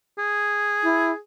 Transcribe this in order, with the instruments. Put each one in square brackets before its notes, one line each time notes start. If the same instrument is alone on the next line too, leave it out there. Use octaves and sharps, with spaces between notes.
[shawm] G#4
[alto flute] E4